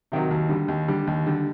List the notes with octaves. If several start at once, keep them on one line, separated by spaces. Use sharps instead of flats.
C3 D#3 F#3
D#2
D3 G3
D#2
D3 G3
D#2
D3 G3